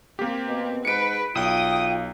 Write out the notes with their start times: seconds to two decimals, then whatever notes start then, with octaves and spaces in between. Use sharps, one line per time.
0.19 A#3 C4 G4
0.47 B2
0.85 G#2 B4 C#7 D7
1.35 B1 F4 G5 D#6